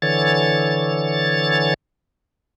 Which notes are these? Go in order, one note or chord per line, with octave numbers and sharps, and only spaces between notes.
D3 E3 C#5 A6